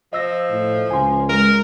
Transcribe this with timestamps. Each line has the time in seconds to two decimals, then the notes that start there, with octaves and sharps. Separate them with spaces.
0.13 F3 D#5 E6 A#6
0.50 A2
0.91 C#2 G#5 C6
1.29 G#3 A#4